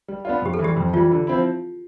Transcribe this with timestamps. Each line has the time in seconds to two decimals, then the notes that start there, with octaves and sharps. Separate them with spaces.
0.08 G3
0.25 B3 D4 F4
0.42 F2 G4
0.54 A4
0.59 E3
0.64 G3 G4
0.77 F2
0.93 E3 G3 F4
1.11 D3
1.27 F3 C4 E4